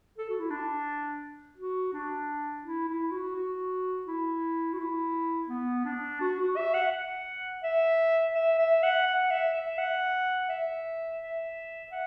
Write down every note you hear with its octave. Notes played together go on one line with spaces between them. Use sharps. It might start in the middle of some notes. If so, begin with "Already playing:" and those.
A4
F#4
E4
D4
F#4
D4
E4
E4
F#4
F#4
E4
F#4
E4
B3
D4
F#4
F#4
E5
F#5
F#5
E5
E5
E5
F#5
F#5
E5
E5
F#5
E5
E5
F#5